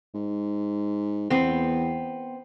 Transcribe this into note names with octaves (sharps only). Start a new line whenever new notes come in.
G#2
E2 B3 C4